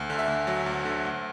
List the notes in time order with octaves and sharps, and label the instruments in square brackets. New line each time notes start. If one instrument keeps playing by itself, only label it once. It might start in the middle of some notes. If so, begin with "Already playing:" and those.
Already playing: [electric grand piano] D2
D3
E5
D2
F#3
D2
D3
D2